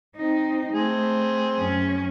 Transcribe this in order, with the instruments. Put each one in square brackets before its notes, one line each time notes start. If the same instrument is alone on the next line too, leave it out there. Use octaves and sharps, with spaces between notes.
[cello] C4 D#4
[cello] A3 [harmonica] C4 G#4
[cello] F#2 C#4